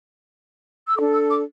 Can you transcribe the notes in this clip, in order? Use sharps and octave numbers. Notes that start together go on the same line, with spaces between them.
E6
D4 A4 D6
E6
D6